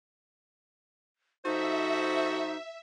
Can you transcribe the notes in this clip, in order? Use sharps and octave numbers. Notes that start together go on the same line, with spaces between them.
F3 D#4 F#4 A4 C5 E5